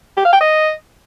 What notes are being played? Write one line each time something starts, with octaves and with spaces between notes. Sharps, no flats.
G4
F5
G5
D#5